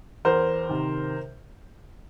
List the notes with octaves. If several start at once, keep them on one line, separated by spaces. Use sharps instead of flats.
E2 A#4 C5
C3 D#3